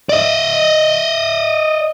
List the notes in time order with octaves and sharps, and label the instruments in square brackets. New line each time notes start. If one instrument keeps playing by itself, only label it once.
[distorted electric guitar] D5 D#5